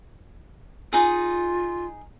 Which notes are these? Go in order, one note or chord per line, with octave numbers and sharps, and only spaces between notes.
D#4 F4 G#4